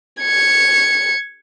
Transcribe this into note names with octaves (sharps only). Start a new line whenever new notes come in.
G#6 C#7